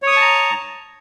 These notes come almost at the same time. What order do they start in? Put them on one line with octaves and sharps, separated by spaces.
C#5 D#6 C#6 A5 A#5